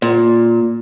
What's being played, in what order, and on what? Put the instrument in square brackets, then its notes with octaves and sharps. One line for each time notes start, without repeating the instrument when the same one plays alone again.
[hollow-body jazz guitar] A#2